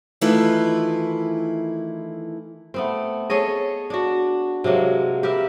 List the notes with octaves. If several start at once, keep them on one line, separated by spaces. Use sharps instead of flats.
D#3 E3 A3 E4 F4 B4
A3 B3 C4
G#4 A4 C#5 D#5
D4 F#4
C3 F#3 G#3 A#3
G4 A#4 B4 E5